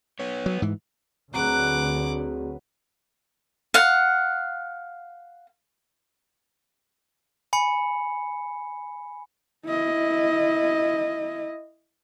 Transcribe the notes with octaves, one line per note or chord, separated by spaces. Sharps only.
B3 C#5
F#3
G#2 E3
D2 F#3 C4 F#4 G#4 B4 F#5 D6
F5 F#5
G#5 B5 C#7
E4 D#5